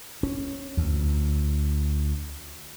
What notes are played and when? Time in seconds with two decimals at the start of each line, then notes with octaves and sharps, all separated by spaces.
0.23 C#4
0.77 D2